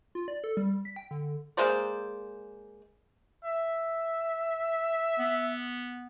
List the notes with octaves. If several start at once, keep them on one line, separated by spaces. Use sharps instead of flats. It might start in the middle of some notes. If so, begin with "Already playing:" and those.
F4
D5
A4
G3
B6
G5
D3
G#3 A#3 C5 D5
E5
B3